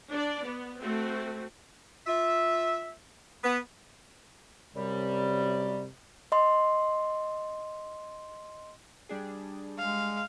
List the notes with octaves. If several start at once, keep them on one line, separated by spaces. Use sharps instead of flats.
D4 D5
B3
A3 C4 F#4
F4 E5
B3
F#2 C3 G3
D#5 C6
G3 D4 G#4
G#3 F5